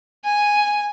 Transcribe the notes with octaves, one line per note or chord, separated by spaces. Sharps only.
G#5